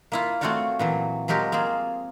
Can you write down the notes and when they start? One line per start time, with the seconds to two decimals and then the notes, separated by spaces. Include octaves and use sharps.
0.12 A#3 E4 F4
0.41 A3 C4 F4 F#4 C#5 D5
0.79 A#2 E3 F#3
1.28 F3 F#3 G#3 G4 A#4
1.52 A#3 C4 F4 G#4